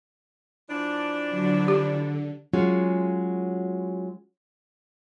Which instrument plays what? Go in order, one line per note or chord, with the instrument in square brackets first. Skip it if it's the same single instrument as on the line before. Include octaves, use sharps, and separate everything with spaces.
[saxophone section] E3 F3 D4
[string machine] D3 F#3
[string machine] D3 [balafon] G4
[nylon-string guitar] F#3 G#3 C#4 F4 F#4